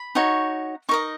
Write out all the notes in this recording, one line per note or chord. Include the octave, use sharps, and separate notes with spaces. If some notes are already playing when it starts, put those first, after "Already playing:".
Already playing: B5
D#4 F#4 C#5
D#4 A#4 D#5 C#6